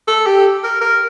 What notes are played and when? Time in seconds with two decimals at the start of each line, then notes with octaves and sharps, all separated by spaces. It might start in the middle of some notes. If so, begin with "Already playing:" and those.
0.08 A4
0.26 G4
0.64 A#4
0.81 A#4